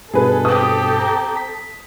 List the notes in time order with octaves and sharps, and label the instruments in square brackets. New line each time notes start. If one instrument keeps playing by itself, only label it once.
[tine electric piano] G2 B2 [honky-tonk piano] G#4 B4 [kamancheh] A4
[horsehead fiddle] C4 G4 [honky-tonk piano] D#6
[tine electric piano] A#5
B6